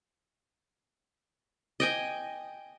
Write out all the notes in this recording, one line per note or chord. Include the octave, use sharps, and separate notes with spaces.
D#5 G5 G#5